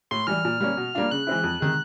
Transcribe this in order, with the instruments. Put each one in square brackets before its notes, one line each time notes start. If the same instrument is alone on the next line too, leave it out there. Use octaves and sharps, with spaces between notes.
[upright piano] A2 [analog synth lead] C6
[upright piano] E3 G3 [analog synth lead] F6
[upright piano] A#2
G3 A#3 C#4
B2
G3 A#3 D4 F4
[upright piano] C#3 [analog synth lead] F#6
[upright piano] E3 G#3 C4 E4
F2
C3 D#3 G#3